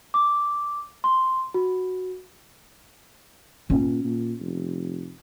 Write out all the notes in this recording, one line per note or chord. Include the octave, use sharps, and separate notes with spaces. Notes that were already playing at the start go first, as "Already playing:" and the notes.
D6
C6
F#4
A#2 C#4
A#2
F1